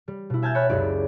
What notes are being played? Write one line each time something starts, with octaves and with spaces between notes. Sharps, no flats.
G3
B2 E4
E5 G#5 A5 F6 G6 A6
C#5 G5 A5 B5 F6 F#6
F#1 C#2 F#3 G4 C#5 D5